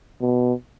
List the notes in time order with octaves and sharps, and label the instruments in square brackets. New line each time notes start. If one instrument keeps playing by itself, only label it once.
[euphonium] B2